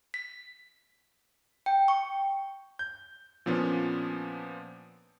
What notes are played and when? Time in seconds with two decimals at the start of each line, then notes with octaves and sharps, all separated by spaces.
0.14 B6
1.66 G5
1.88 C#6
2.79 G6
3.46 A#2 F3 B3 C#4 D4